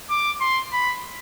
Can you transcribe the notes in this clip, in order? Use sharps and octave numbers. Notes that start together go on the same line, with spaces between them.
D6
C6
B5